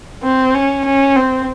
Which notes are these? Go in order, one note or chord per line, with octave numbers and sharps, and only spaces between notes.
C4
C#4
C#4
C4